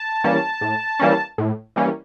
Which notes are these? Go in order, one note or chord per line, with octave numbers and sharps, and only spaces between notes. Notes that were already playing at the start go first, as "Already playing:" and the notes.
Already playing: A5
E3 G3 A#3 C#4
A2
E3 G3 A#3 C#4
A2
E3 G3 A#3 C#4